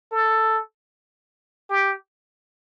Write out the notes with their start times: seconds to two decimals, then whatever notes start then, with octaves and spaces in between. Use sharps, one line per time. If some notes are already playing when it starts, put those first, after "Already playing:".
0.11 A4
1.69 G4